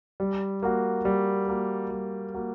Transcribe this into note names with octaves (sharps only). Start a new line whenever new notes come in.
G3
A#3 F#4
G3
A#3 F#4
G3
A#3 F#4